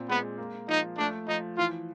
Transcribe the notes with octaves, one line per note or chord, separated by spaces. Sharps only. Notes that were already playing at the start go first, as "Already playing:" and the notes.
Already playing: A#2 C4
G#3 B3
A#3
F3 D#4
A3 D4
F3 D#4
E3 F4